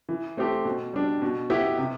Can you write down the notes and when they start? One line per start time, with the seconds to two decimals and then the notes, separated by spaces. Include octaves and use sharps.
0.09 E3
0.37 A3 C4 G4
0.65 B2
0.93 G3 D4
1.22 B2
1.50 B3 E4 G4
1.78 C3